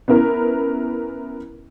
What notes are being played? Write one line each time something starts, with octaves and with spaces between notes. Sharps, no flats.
B3 C#4 E4 A#4